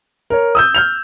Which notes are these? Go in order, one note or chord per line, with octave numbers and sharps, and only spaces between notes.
A#4 C#5
D#6 E6 G6
F6 G6 F7